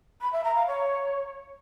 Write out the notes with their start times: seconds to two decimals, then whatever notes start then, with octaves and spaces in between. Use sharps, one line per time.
0.21 B5
0.33 E5
0.44 A#5
0.55 F5
0.67 C#5